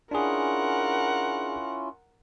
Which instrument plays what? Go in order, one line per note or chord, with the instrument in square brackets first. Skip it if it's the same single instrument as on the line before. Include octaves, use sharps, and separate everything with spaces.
[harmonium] C#4 E4 F4 [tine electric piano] D4 G#4 [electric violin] A#4 F#5